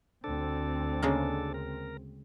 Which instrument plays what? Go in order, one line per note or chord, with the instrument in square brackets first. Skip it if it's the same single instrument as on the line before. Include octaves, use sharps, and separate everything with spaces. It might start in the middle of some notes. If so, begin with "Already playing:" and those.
[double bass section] D2 C4 [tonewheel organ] D4 A4
[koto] C#3 G#3 A#3
[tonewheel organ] A#4